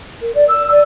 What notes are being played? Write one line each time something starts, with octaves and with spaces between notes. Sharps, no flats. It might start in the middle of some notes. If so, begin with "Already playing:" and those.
A#4
D5
E6
D5